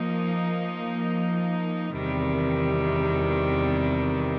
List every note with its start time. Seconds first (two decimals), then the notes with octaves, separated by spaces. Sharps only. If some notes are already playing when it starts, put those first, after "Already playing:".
Already playing: F3 A#3 D#4
1.92 E2 C3 D#3 G3